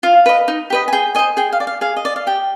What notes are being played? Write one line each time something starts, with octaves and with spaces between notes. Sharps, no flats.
F4 F5
B4 D#5
D#4
G4 B4 D#5
G#5
G#4 G5
C5 D#5 G#5
G#4 G5
F5
D5
F5
G#4 F5
D#5
D5
F5
G4 G5